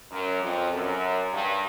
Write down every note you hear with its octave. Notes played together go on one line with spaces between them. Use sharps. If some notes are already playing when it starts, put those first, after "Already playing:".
F#2
F2
F#2
G2